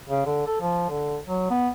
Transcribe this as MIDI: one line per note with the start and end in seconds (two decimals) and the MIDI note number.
0.09 0.25 49
0.26 0.44 50
0.46 0.59 69
0.60 0.86 53
0.89 1.17 50
1.26 1.48 54
1.50 1.70 59